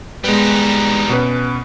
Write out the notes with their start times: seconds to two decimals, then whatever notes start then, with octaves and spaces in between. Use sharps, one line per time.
0.24 G3 G#3 B3 D#4 B4
1.09 B2 C#4 B4